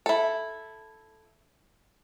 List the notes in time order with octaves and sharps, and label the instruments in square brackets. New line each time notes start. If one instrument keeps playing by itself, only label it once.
[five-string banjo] E4 A4